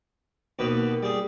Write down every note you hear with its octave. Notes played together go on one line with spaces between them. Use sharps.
D#2 B2 B4
G3 G#4